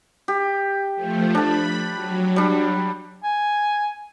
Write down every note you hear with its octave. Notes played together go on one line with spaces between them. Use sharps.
G4
F3 A3
D4 A5 B5
F#3
G3 D4
G#5